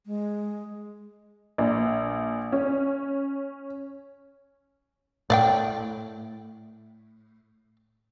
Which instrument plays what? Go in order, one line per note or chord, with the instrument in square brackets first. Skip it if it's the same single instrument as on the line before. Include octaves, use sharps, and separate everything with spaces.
[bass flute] G#3
[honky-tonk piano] A#1
C#4
[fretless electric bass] A2 [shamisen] D5 F5 G5